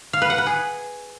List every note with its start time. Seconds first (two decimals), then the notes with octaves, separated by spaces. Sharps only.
0.13 F5
0.22 B4
0.30 F#5
0.38 B4
0.46 G#4